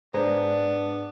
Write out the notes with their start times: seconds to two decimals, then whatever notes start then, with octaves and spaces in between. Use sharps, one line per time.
0.14 G#2 B3 D4 G#4 C5 D5 A#5